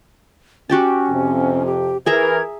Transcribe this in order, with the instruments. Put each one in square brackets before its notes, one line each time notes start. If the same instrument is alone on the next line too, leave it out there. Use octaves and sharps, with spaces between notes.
[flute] C#4 [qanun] F#4 G4 A5
[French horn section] F2 C3
[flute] G4
[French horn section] E3 A#4 [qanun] G#4 E5 A#5 [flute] G#6